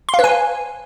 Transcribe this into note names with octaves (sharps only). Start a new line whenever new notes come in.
C6
F5
B4
G#5